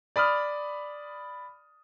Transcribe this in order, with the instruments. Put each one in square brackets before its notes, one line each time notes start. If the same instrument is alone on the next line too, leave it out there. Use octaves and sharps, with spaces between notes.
[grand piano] D5 B5 D#6 F6